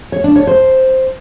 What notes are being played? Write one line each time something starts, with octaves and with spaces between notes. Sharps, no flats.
C#5
D4
C#5
C5